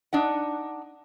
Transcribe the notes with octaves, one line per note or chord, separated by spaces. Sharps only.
D4 D#4 F#5